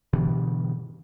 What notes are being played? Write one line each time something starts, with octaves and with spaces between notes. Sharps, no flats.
G2 B2 D3 E3